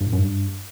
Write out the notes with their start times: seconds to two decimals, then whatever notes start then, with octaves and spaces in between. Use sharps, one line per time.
0.01 G2
0.07 A2
0.13 F#2
0.19 G2